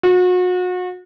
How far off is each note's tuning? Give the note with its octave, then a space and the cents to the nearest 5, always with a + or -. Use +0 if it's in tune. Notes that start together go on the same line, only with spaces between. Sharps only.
F#4 -35